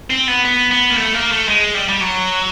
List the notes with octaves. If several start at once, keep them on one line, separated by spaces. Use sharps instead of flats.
C4
B3
B3
B3
A#3
A3
A#3
A3
G#3
G3
G3
F#3